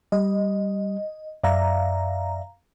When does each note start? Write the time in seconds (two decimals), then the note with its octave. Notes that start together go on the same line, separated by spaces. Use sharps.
0.12 G3 D#5
1.44 F#2 D5 E5 F5 A#5